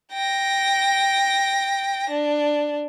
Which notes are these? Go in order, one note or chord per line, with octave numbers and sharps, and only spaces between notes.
G5 A#6
D4